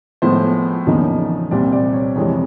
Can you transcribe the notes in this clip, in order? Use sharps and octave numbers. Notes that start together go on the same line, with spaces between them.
A2 F3 G#3 B3 C5
E2 C#3 F3 A#3 D#4
C2 A#2 G3 C4 D5
D5
C#5
F2 C3 E3 G#3 C#5